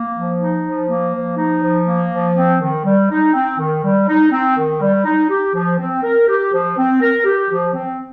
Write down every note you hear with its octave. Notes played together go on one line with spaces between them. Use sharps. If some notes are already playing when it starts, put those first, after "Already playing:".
Already playing: A#3
F3
D#4
F3
A#3
F3
D#4
F3
A#3
F3
C4
D#3
G3
D#4
C4
D#3
G3
D#4
C4
D#3
G3
D#4
G4
F3
C4
A#4
G4
F3
C4
A#4
G4
F3
C4